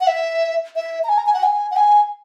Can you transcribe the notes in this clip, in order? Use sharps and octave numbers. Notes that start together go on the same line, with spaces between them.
F#5
E5
E5
A#5
G#5
A#5
G#5
F#5
G#5
F#5
G#5